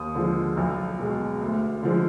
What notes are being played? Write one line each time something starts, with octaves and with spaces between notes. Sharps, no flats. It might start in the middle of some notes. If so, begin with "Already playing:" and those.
Already playing: D#2 D#6
D3 F3 G#3
B1
B2 G#3
D2
D3 F3 G#3